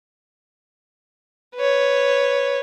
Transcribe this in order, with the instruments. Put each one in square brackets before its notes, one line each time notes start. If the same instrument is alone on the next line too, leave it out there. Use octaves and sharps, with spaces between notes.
[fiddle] B4 C#5